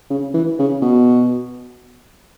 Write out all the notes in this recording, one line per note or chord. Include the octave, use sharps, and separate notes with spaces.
C#3
E3
C#3
B2